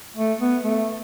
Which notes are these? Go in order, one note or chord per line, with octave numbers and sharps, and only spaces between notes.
A3
B3
A3